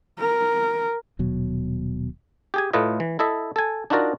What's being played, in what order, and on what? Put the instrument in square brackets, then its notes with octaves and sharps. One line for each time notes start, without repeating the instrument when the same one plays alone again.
[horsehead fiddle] A#4
[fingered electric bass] D#1 B2 F#3
[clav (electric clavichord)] G4 G#4 G#5
A2 A3 F4 B4 D#5
E3
E4 A4 D#5 E5
A4 G#5
D4 D#4 F4 F#4 A#4 D5